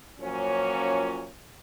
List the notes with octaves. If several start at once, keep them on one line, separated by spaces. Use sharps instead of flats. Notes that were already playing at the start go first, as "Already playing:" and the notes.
A#2 F3 F#3 A#3 C#4